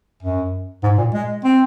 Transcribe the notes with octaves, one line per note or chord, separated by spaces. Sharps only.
F#2
G#2
A#2
G#3
C4